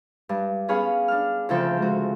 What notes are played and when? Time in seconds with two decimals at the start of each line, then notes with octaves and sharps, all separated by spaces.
0.29 G2
0.68 B3 C#4 G#4 C#5 F5 B5
1.08 D4 F6
1.49 D2 C#3 F3 C4 A4 G5
1.78 G#3 F#4